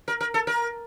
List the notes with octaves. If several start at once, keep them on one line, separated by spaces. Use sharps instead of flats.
A#4
A#4
A4
A#4